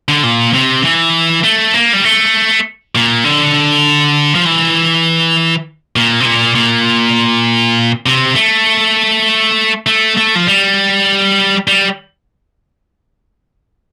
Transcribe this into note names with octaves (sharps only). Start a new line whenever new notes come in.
D3
A#2
C3
E3
A3
A#3
G3
A3
A#2
D3
F3
E3
A#2
C3
A#2
A#2
C3
A3
A3
A3
F3
G3
G3